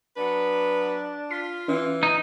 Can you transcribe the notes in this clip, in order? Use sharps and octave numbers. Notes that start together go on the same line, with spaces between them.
F#3 B3 D4 B4
F4 B6
E3 C#4
D#4